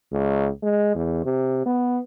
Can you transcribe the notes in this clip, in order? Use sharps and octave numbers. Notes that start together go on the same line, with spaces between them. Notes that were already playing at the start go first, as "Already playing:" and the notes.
C#2
G#3
E2
C3
B3